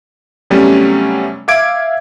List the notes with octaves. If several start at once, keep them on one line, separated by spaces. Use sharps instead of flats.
C3 F#3 G3 A3 B3 C#4
E5 F5 D6 G#6 D7